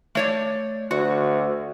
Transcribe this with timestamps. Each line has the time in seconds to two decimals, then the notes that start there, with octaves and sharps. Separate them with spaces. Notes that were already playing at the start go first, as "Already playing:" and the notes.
0.15 A3 C#5 D5
0.91 D2 F#4